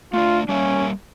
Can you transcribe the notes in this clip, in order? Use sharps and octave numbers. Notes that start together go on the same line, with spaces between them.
A3 D4 F4
G3 A#3 C#4 E5